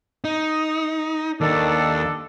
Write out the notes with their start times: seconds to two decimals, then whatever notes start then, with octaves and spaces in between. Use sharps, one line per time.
0.24 D#4
1.41 D#2 D#3 D4 A4